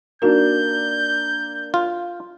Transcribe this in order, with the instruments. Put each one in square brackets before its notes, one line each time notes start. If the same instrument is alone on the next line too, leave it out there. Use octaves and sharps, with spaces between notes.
[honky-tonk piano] A#3 D4 [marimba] D#4 F#4 A#4 [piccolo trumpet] G6
[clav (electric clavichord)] F4